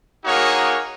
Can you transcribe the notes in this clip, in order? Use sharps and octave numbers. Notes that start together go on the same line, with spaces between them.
A#3 D#4 F#4 G#4 A#4 C#5